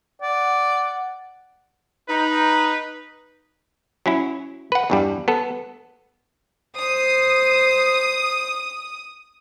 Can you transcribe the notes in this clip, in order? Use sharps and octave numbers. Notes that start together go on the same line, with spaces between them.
D5 F#5
D#4 B4
F#3 C#4 E4
B4 F#5
E2 G2 G3
B3 A4
C5 D#6